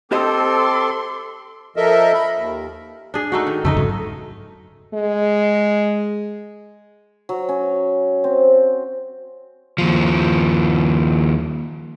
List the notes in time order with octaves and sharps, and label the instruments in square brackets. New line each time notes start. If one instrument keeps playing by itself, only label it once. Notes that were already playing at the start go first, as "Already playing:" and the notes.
[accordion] C4 A4 [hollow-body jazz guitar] G4 C5 D#5 [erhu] C6 [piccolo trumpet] D6
[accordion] F3 A4 A#4 D#5 E5
B5
D#2
[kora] D4 G#4
A3 D#4 F#4
D#3
[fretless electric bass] F2 C#3 [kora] A3 D#4 D#5
[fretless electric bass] G#2 C#3 F#3
[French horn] G#3
[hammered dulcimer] F#3
C#4
C4
[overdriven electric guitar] D#2 F3